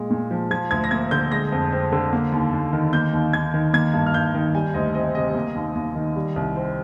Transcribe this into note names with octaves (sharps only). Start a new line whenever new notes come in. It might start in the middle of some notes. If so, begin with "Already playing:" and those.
Already playing: A#2 G#3
A#2
F3
F3 G#6
D2 G#6
A#6
A#3 G#6
D3 G6
G#3 A#6
F2
C4
D3
A#3
D#2
D#2
D#3
A#3 G6
D#2
D#2 G#6
D#3
A#3 G#6
G2
F6
G2 G6
D#3
G3 G#5
D2 D#5
C4 D#5
C3 D#5
A#3
D#2
D#2
D#3
G3
C2
C4